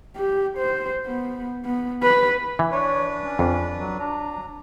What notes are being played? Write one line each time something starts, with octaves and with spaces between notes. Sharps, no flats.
G4
C5
B3
B3
B4
E3
D4 B4 C#5
C#4
F2
F#3
F#3 D4 A#5